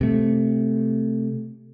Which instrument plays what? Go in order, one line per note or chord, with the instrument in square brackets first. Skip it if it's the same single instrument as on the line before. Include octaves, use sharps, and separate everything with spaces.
[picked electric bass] C3 A3